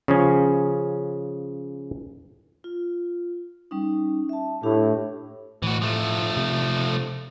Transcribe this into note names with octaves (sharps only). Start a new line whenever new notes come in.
C#3 F3 C#4
F4
G3 C#4 D#4
E5 A5
A2 D4 G4
A2 E3 F#4
F3 A3
C3